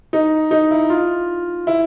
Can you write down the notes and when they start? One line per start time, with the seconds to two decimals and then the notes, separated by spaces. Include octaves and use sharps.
0.13 D#4
0.51 D#4
0.71 E4
0.90 F4
1.67 E4